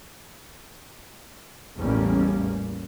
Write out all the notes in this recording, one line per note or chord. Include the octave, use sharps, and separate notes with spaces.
A1 E2 G3 A#3 C#4